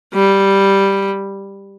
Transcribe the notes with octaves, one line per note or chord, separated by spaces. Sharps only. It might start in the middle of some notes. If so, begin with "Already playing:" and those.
G3